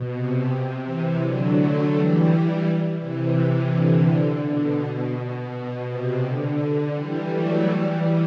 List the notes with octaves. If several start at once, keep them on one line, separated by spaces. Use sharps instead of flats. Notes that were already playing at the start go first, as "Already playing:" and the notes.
Already playing: B2
C3
C3 E3
D3 F#3
F#3 A3
E3 G3
C3 E3
D3
B2
B2
B2
C3
D3
E3 G3
F#3 A3
E3 G3